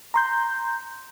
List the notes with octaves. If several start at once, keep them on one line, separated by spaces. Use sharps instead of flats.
A#5 C6 G6